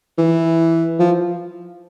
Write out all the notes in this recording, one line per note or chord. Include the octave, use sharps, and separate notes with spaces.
E3
F3